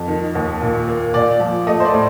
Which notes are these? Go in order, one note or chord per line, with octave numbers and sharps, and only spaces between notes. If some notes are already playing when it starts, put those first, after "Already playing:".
Already playing: F2
D#3
D#2
A#2
A#3
A#2 D5
F3
A3 D#5
C5
D5
A2